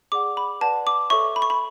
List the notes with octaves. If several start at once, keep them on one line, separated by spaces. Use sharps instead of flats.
G#4 D5 F#5 D6
B5
B4 D5 F#5 A5
D6
A4 C#5 E5 C#6
B5
C#6
B5